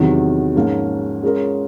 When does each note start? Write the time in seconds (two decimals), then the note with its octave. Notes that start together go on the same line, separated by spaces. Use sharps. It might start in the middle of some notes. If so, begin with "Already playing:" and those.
Already playing: E2 C3 D#3 F#3
0.56 G#2 F3 A#3 C#4
1.23 G#3 C#4 F4 A#4 C#5